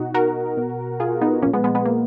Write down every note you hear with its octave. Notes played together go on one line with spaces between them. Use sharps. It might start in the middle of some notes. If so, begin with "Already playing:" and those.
Already playing: B2 D#4 F#4
F#4 A#4
B2
F4 G#4
B3 D#4
A#2 F3 A#3 C#4
G#3 B3
G#3 B3
G#3 B3
A#3